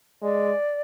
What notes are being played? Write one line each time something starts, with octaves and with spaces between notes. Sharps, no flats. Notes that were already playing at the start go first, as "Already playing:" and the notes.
G#3 D5